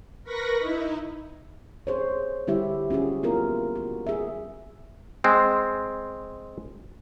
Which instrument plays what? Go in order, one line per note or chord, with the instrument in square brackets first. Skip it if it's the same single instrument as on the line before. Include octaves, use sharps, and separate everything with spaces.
[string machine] A#4 B4 B5 C#6 A#6
D#4 E4
[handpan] G#4 C5 C#5
D3 G3 E4 G4 E5
C#4 F4 F#4 G#4
A#3 B3 E4 F4 A#4
F#4
G#4 E5
[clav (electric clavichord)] G#3 C4